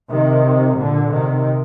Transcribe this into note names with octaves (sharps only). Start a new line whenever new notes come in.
C3 D#3
A#2 D3
C3 D#3